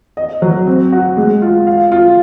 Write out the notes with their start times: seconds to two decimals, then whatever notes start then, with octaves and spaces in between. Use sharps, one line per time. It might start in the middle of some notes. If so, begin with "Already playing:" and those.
0.17 D#5
0.42 F#3
0.67 C4
0.92 F#4
1.17 G#3
1.42 F4
1.67 F5
1.92 F4